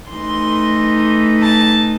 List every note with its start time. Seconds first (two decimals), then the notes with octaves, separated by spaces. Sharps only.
0.11 E3 A3 D#4 C6
1.43 A5